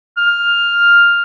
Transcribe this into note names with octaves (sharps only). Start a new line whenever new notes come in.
F6